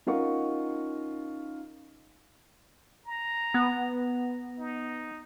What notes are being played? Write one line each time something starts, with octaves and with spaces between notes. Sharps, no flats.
C#4 D#4 F4 A#4 F#5 C#6
A#5
B3
D#4